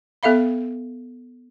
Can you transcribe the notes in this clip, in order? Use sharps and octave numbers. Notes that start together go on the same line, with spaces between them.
B3 A4 E5 F5 B5